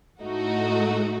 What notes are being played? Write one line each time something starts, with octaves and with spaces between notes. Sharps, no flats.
A2 A3 D#4 F#4